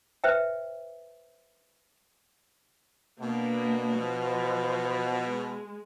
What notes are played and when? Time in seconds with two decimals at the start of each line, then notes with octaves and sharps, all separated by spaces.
0.24 B4 C5 E5 G5
3.20 B2 A#3 D4
3.99 F3
5.29 G#3